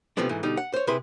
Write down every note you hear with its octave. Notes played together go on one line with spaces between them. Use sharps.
C3 E3 F3 A3 B3 D4
G#2 E3 A3
B2 D3 G3 D#4
F#5
C5 C#5
C3 E4 G#4 B4 C6